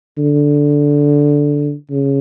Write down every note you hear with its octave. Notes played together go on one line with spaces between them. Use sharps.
D3
C#3